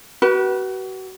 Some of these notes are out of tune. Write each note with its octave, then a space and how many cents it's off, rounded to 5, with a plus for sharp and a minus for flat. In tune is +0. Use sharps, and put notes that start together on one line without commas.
F#4 +35 B4 -25